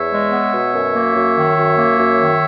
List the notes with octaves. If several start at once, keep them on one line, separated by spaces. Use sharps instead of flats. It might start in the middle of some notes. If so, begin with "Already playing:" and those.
Already playing: E2 C#5 E5
G#3
B3
B2
F#2
A#3
F#2
D#3
F#2
A#3
F#2
D#3